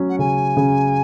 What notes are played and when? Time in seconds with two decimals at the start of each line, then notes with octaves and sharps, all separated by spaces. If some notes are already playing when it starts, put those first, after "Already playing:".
Already playing: F#3 C#4
0.09 F#5
0.18 C#3 G#5
0.57 C#3